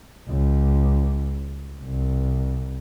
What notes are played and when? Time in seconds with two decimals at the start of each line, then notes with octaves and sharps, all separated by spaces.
0.28 C#2
1.84 C2